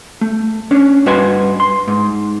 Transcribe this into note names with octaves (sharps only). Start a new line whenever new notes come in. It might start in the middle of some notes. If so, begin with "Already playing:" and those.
A3
C#4 D4 C#5
G2 F#4 B4 D#5 G#5 C6
C6
G#2